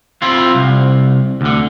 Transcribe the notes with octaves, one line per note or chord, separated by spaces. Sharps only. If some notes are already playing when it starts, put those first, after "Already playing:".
C4 E4 F4
C2
D2 D3